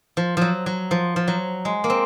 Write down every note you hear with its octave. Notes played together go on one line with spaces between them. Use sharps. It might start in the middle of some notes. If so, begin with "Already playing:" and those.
F3
F3 F#3
F#3
F3
F3
F#3
G#3
A#3
C4